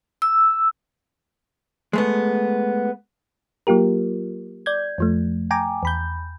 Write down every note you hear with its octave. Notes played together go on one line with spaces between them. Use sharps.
E6
G#3 A3 B3
F#3 A#3 F4 G4 A#4
D5 G6 G#6
F2 F3 A3
G5 G#5 A#5 D6
E2 B5 G6